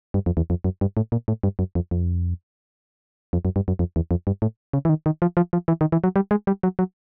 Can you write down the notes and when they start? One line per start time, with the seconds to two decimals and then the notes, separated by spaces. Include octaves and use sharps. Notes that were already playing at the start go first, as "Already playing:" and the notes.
0.14 G2
0.26 F2
0.37 E2
0.50 F2
0.64 F#2
0.81 G2
0.97 A2
1.12 A#2
1.28 A2
1.43 G2
1.59 F#2
1.75 F2
1.91 F2
3.33 F2
3.45 F#2
3.56 G2
3.68 F#2
3.79 F2
3.96 E2
4.11 F2
4.27 G2
4.42 A2
4.73 C#3
4.85 E3
4.89 D#3
5.06 D#3
5.22 F3
5.37 F3
5.53 F3
5.68 E3
5.81 D#3
5.92 E3
6.04 F#3
6.16 G3
6.31 G#3
6.47 G3
6.63 F#3
6.79 F#3